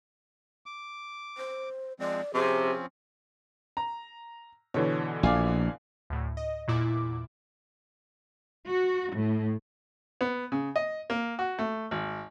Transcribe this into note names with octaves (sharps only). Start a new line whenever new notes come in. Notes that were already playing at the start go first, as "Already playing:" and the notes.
D6
C5
F3 G#3 C4 D5
C3 F3 C4 C#4 G#4
A#5
B2 D3 E3 C#5
A#1 D5 F5 G#5
D2 A2
D#5
E2 A#2 E4 D6
F#4
A2
B3
C#3
D#5
A#3
F#4
A3
G#1